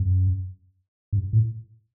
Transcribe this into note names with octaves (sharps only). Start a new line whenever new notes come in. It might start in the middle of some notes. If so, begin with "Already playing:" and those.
Already playing: F#2
G2
A2